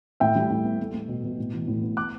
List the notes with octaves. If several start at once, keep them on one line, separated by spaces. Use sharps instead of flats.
A2 E5 G5
G3
A2
B3
A3
A3
B2
B2
A2
E3
A2
B3
D6 F#6